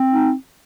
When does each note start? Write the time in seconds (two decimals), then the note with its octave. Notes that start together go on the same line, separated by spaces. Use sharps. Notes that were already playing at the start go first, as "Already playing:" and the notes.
Already playing: C4
0.11 D#4